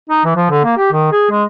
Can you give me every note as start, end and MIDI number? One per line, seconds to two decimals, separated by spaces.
0.10 0.20 63
0.24 0.34 52
0.36 0.45 53
0.50 0.64 50
0.65 0.77 58
0.77 0.91 67
0.92 1.12 51
1.12 1.27 68
1.31 1.44 56